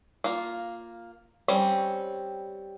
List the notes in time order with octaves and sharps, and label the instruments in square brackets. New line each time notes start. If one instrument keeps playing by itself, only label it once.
[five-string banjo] A#3 F4
G3 C4 C#4